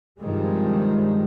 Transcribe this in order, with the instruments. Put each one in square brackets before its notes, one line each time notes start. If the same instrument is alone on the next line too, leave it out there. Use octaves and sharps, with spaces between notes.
[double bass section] G2 C3 D#3 F3 G3 G#3